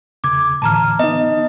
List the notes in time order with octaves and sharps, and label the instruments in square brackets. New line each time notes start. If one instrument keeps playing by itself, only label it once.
[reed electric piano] E2 C#3 G#6 [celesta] D6
[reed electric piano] A2 D3 E3 [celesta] A5 A#5 F6
[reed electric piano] B3 D#4 [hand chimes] D#5